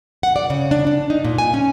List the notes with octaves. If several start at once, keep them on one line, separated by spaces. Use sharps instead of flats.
F#5
D5
C#3
D4
D4
D#4
A#2
G#5
C#4